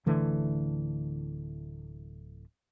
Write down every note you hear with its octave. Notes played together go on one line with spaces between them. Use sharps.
D1 D3 E3 A3